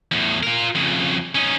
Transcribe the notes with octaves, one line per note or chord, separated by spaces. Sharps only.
E2 A2
F4 A#4
F2 C#3
C#4 D#4